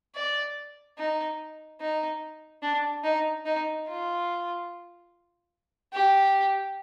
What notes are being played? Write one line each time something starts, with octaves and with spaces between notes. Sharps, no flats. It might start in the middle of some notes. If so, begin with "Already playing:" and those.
D5
D#4
D#4
D4
D#4
D#4
F4
G4